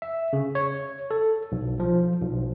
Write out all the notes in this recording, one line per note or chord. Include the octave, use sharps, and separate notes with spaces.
E5
C#3
C#5
A4
B1
F3
B1